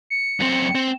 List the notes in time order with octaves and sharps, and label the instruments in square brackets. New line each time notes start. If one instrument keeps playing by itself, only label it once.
[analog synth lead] C#7
[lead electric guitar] F#2 C4
C4